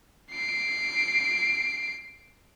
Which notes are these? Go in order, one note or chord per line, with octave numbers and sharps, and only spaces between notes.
C7 D7